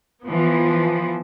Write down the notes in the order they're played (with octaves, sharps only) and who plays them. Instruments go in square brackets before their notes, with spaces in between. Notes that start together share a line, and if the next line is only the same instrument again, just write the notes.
[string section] E3 F3 B3